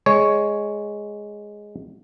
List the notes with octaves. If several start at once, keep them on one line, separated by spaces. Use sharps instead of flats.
G#3 C#5